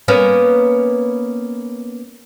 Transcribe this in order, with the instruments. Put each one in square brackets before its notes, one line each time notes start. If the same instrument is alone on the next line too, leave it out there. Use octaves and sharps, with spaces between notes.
[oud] A#3 B3 C#4